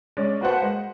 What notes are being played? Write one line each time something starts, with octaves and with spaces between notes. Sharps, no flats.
G#3 C#4 D5
A#3 F#4 B4 C5 F#5 A5
G#3